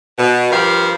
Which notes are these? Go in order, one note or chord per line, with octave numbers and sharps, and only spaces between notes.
B2
G2 F3 G4 A#4 F5